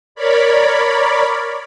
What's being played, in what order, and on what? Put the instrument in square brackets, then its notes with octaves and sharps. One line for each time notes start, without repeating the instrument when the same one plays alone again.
[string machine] A#4 C#5 D5 B5